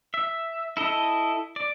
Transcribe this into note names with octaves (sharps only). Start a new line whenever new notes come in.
E5
E4 A4 D#5
D5